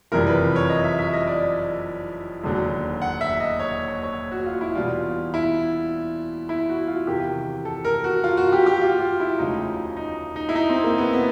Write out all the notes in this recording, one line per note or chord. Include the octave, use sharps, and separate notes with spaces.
F#1 F2 C3 E3 G3 A#4
B4
C#5
D#5
E5
E5
D#5
D5
E1 D#2 D3 F#3
F#5
E5
D#5
C#5
C#5
C#5
F#4
F4
E4
E2 B2 G3 F4
E4
E4
F#4
F4
E2 C3 D#3 G4
A4
A#4
F#4
F4
F#4
G4
G4
F4
F4
E4
E1 D2 C#3 F3 D#4
D#4
D#4
E4
D#4
C4
A#3
B3
B3